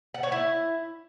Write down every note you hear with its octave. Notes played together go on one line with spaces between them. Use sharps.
F#5
C#5
E4